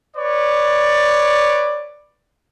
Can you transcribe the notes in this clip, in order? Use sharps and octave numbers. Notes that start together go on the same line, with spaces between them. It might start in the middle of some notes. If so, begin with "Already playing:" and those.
B4 C#5 D5